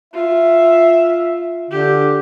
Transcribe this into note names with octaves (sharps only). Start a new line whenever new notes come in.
F4 E5
D3 G4